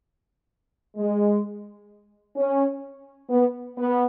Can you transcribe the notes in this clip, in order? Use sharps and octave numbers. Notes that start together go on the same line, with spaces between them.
G#3
C#4
B3
B3